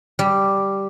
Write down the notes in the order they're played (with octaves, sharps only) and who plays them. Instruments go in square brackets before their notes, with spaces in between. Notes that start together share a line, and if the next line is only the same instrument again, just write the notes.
[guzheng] G3